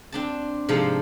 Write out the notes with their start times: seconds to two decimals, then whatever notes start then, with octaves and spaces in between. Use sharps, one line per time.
0.12 C4 D4 A5
0.68 G#2 C3 F3 A4 C5